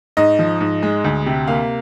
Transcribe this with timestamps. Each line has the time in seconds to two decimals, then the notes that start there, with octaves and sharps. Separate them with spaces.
0.17 G#2 D#5
0.39 F3
0.61 G#2
0.83 G#3
1.04 D2
1.26 C3
1.47 A#3 F5